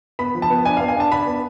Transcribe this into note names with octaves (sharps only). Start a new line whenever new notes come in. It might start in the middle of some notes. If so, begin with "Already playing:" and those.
B3 B5
F3
A5
B3
D4 G#5
B3 F5
G#5
D4 A5
D4 B5
B3